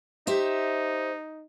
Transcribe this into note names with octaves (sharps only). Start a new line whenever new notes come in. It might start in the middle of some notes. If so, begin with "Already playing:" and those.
D#4 G4 C5 E5